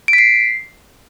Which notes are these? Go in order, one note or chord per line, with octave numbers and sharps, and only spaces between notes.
D7
B6
C7